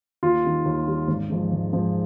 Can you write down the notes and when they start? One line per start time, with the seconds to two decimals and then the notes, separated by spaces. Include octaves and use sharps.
0.23 D#2 F4
0.44 D#3 G3
0.65 D#2
0.87 D#3 G3
1.08 G#1
1.30 G#2 F3 G#3
1.52 G#1
1.72 G#2 F3 G#3